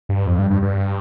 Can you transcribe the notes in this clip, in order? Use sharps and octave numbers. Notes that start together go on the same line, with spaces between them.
G2
F2
G2
G2
G2